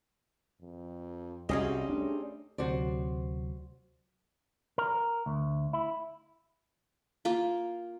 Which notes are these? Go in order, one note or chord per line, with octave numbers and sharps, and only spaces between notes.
F2
C2 G3 C4 C#4 D#4 F#4 G#4 D#5
A3 D4
D2 C3 F#3 F#4 C5 D5
A#4
D2
E4
A#3 F4